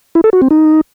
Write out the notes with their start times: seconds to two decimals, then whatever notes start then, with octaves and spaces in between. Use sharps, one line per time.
0.15 E4
0.24 A4
0.33 F#4
0.42 C4
0.51 D#4